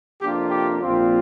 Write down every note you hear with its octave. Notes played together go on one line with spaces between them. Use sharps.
F2 C3 A#3 D4 F4 G4
G4
A#1 A#2 F3 C4 F4